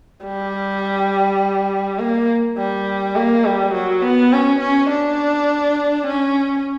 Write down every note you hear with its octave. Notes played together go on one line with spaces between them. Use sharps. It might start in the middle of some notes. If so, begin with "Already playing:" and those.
G3
A#3
G3
A#3
G3
F#3
B3
C#4
C#4
D4
C#4